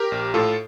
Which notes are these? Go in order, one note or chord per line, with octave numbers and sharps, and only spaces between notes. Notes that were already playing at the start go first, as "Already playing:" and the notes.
Already playing: G4 A#4
A#1
A2 F4 A4